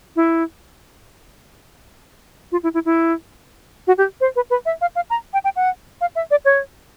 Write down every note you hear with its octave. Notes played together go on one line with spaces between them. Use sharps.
E4
F4
E4
E4
E4
F#4
G4
C5
B4
B4
E5
F5
F5
A#5
G5
G5
F#5
F5
E5
D5
C#5